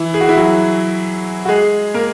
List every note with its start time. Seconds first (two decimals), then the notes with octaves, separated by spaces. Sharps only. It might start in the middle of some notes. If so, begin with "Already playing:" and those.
Already playing: E3 E4
0.14 G#4
0.21 F#4
0.29 E4
0.36 F#3 F#4
1.45 F#4
1.49 G#3 G#4
1.94 A#3 A#4